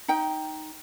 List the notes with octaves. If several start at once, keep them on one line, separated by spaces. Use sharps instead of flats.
D#4 G5